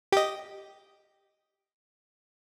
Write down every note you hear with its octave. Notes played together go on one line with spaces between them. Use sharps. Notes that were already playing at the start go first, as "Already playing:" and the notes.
G4 D#5